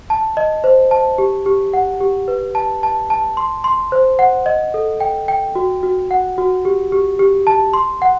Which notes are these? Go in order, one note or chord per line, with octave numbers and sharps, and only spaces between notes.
A5
D#5
C5
A5
G4
G4
F#5
G4
B4
A5
A5
A5
C6
C6
C5
F#5
D#5
A4
G5
G5
F#4
F#4
F#5
F#4
G4
G4
G4
A5
C6
F#5